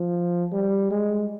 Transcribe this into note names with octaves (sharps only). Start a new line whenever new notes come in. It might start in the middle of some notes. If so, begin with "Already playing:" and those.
Already playing: F3
G3
G#3